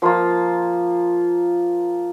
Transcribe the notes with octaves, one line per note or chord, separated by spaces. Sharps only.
F3 A#3 F4 C6